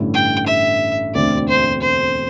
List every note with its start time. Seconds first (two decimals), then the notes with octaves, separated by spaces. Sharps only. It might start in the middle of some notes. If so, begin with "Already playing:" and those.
Already playing: A1 G2 D3 A3 E4
0.14 G5
0.47 E5
1.14 E1 D2 D3 A3 C4 D5
1.49 C5
1.82 C5